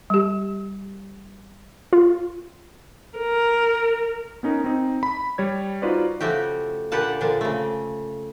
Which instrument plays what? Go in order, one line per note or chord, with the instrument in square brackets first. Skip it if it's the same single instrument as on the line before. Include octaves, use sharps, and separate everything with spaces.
[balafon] G3 G4
[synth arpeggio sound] F4
[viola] A#4
[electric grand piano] B3 C#4 D#4 A#4
C4 D#4
B5
G3 C#5 G#6
D#4 F4 F#4 B4 C5 D5
[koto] C#3 F3 A3 F#4 G4
A#2 D3 G4 B4 F#5 A5
A#2 D3 F3 D4
C#3 A3